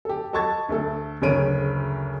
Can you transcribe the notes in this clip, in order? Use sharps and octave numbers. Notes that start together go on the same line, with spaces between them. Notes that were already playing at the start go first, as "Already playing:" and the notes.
G4 A4
A4 D#5 A5 C#6 G#6 A6
D2 A3 A4
F#1 D2 C#3 C#4 D7 D#7